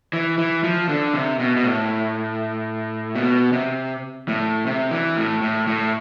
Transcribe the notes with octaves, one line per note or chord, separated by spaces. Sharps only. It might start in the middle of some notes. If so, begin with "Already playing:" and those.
E3
E3
F3
D3
C3
B2
B2
A2
B2
C3
A2
C3
E3
A2
A2
A2